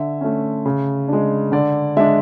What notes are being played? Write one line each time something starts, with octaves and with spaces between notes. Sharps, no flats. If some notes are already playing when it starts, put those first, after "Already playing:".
Already playing: D3 E5
A3 C#4
C#3
G#3 D4
D3 D5
G#3 D4 E5